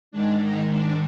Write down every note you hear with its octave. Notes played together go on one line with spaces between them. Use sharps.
G#2 D#3 G#3 D4
D#4
D4